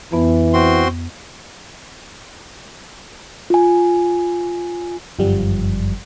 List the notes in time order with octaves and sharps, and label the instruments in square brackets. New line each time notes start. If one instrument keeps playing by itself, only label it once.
[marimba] F2 B3 [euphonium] E3
[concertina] C4 F#4 C6
[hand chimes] F4 G#5
[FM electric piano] G1 F#2 F3 G3